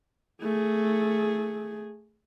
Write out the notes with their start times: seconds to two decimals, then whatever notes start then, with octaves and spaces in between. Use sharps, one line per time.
0.43 A3 G#4